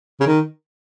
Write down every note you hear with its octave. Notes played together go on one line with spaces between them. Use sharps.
C#3
D#3